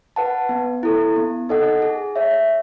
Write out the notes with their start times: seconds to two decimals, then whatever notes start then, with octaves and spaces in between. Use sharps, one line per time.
0.16 B4 F#5 A5
0.49 B3
0.83 E4 A4
1.16 B3
1.49 D#4 A4 D#5 F#5
1.82 G#4
2.16 C#5 E5